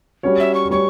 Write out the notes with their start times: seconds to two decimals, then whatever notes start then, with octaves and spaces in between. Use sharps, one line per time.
0.23 G3 C#4 F#4 C#5
0.40 E5
0.55 C#6
0.70 G3 C#4 F#4 C#5 C#6